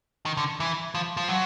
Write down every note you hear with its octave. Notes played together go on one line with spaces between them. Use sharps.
D#3
D3
E3
F3
F3
F#3